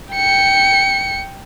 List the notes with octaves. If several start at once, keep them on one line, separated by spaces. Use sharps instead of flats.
G5 C#7